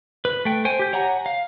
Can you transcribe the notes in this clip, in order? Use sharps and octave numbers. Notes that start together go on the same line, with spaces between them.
B4
A3 G5
C5 G5 G#5
G4 G6
C#5 F#5 G#5 A#5
F5